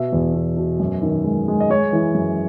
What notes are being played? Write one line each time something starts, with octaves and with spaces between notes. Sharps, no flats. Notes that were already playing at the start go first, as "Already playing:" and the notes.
Already playing: B2 E5
E2
B2
B2
F#2
D#3
G#3
G#3
D#5
G#3 C#5
E3
F#2